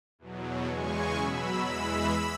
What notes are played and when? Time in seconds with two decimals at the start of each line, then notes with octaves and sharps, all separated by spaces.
0.19 E2 B2 F#3
0.67 E2 C#3 G#3 G#5 C#6
1.15 B2 F#3 B5 E6
1.63 E2 E3 G#3 B5 E6